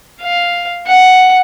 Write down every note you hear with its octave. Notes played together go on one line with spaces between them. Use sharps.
F5
F#5